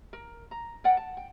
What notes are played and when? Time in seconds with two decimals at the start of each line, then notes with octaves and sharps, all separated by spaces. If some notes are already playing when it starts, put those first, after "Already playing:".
0.13 A#4
0.51 A#5
0.84 A#4 D5 F#5 G5
0.97 A5
1.17 G5